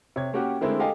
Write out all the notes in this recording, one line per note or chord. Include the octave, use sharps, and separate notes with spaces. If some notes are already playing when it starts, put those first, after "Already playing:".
C3 C#5 G#6
A#3 C#4 F#4 G4 A#4 F#5
D3 G#3 A3 C4 E4 A#4
G4 A4 D#5 F5 G5 G#5